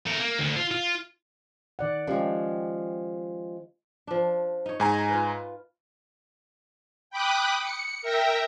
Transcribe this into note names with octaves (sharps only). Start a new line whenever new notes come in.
A3 A#4
A#3
D2 D3
F4
F4
D#3 D5 F#5
F3 G#3 C#4 G4
F3 D4
D#4 C#5
G#2 G#5 A#5
F4 B4
G5 B5 D6 D#6 F#6
C#7
A#4 E5 G5 A#5